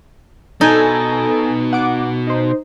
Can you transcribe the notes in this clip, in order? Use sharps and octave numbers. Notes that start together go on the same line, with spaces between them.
B2 D#4 A4 G#5
F#5 D6
D#4 C5